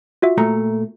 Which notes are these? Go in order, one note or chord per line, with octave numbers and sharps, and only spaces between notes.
F4 F#4 E5
A#2 A3 A#5